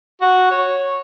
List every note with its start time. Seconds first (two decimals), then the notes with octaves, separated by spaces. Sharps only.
0.21 F#4
0.51 C#5